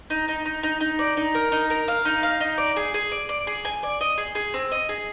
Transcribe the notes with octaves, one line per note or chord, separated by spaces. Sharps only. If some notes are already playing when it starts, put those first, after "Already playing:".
D#4
D#4
D#4
D#4
D#4
D5
D#4
A#4
D#4
A#4
F5
D#4
F5
D#4
D5
G#4
G#4
D5
D5
G#4
G#5
D5
D#5
G#4
G#4
C4
D#5
G#4